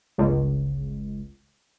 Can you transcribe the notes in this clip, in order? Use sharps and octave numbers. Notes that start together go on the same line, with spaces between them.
G1 C#2